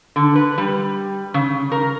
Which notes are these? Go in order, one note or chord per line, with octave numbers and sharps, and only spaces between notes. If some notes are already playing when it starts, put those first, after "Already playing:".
D3
B4
G3
C#3
A#4